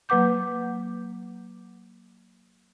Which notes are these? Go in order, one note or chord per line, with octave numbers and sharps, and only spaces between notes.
F#3 A#3 B4 F#5 D6 G6